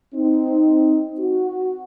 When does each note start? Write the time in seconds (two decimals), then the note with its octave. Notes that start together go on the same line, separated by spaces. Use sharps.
0.15 C4 D#4
1.19 F#4